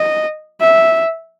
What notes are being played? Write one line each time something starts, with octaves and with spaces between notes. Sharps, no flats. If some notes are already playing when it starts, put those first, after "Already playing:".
Already playing: D#5
E5